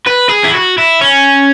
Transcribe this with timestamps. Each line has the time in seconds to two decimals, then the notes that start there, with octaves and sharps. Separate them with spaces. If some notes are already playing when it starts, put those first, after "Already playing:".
0.07 B4
0.30 G#4
0.44 E4
0.54 F#4
0.78 E4
1.01 C#4